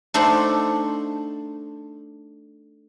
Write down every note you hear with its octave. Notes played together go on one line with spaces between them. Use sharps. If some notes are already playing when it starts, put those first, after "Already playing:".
A3 D4 D#4 A4 C5 F#5